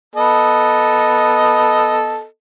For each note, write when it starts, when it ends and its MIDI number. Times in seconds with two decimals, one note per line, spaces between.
0.16 2.25 59
0.16 2.25 69
0.16 2.25 75